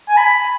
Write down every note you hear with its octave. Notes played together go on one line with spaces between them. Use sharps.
G#5
B5